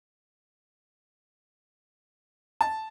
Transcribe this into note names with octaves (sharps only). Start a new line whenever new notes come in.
A5